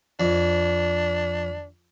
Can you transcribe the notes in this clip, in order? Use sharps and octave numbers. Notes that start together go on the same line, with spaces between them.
F2 D4